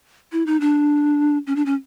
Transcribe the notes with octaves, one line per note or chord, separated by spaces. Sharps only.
E4
D#4
D4
C#4
D4
C#4